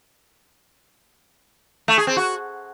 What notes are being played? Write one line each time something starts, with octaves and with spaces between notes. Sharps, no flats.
A3
G#4
C4
F#4